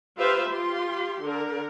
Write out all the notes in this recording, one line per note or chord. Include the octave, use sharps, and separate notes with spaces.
F4 G4 B4 C5 E5 F5
F4 G4 C6
D3 A#4